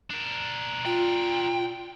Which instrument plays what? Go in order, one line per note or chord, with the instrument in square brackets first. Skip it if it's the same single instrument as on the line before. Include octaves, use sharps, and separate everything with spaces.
[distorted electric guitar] D4 A#4
[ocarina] F4 [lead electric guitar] G5